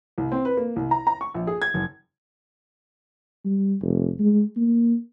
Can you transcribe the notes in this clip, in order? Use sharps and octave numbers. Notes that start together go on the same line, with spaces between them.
C2
C4
B4
A#3
C2
A#5
A#5
C#6
A#1
G#4
G#6
F#1
G3
F1
G#3
A#3